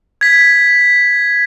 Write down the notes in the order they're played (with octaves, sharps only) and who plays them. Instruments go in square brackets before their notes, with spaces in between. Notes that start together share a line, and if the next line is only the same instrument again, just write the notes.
[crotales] G#6 B6